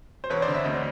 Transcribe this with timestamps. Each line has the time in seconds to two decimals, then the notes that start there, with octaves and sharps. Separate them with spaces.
0.24 C5
0.30 E1 B4 C#5
0.42 C5 D5
0.48 D3
0.54 E5
0.64 D2 D#5
0.75 D5